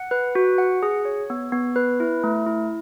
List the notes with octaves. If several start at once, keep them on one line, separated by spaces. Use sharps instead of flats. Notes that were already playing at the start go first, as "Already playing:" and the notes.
Already playing: F#5
B4
F#4
F#5
G#4
C#5
B3
B3
B4
E4
A3
E4